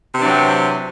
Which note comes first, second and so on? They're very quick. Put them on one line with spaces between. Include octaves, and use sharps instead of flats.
C3 E3 D4 F#3 C4